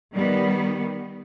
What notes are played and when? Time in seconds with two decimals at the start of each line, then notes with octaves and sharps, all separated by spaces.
0.15 D#3 G3 B3